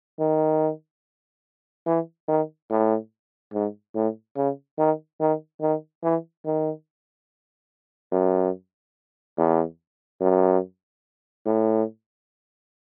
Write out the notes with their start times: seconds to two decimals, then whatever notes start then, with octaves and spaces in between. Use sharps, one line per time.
0.20 D#3
1.86 E3
2.28 D#3
2.70 A2
3.53 G#2
3.95 A2
4.37 C#3
4.78 D#3
5.20 D#3
5.61 D#3
6.03 E3
6.45 D#3
8.12 F#2
9.38 E2
10.21 F#2
11.46 A2